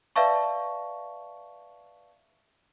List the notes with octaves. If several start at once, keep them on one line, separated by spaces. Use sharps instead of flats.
B4 D5 E5 F5 A5 C#6